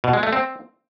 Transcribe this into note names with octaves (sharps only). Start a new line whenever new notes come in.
B2
G#3
A3
C4